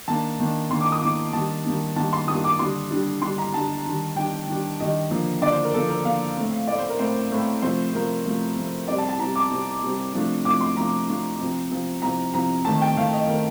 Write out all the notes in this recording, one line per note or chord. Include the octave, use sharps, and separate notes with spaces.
D#3 A#3 D4 A5
D#3 A#3 D4
D#3 A#3 D4 C6
D6
D#6
D#3 A#3 D4 D6
D#3 G3 A#3 D4 A5
D#3 G3 A#3 D4
D#3 G3 A#3 D4 A5
C6
D#3 G3 A#3 D4 D#6
D6
D3 G3 D4 C6
D3 G3 D4
D3 G3 D4 C6
A#5
D3 G3 D4 A5
D#3 G3 D4
D#3 G3 D4 G5
D#3 G3 D4
D#3 G3 D4 D#5
D3 F3 A#3 D4
D3 F3 A#3 D4 D5
C5
A#4
D3 F3 A#3 D4 A4
A#4
D3 F3 A#3 D4 F5
A2 A3 C4
A2 A3 C4 D5
C5
A#4
A2 A3 C4 C5
A2 A3 C4
C3 F3 A3 C5
C3 F3 A3 A#4
C3 F3 A3
C3 F3 A3
C3 G3 C4 D5
A5
A5
C3 G3 C4 A#5
D6
C3 G3 C4
C3 G3 C4
C3 F3 A3 D4
C3 F3 A3 D4 D6
C6
C3 F3 A3 D4 A#5
C3 F3 A3 D4
C3 F3 C4
C3 F3 C4
C3 F3 C4 A#5
C3 F3 C4 A#5
D#3 A3 C4 A5
G5
D#3 A3 C4 F5
D#5
D#3 A3 C4 A#4